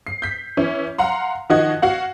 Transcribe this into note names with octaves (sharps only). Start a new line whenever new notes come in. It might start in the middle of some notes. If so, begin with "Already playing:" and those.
C7
G6 B6
E3 C#4 E4
F5 F#5 A#5 C6
D#3 F3 F#4 D#5 F#6 G#6
F#4 F5 F#5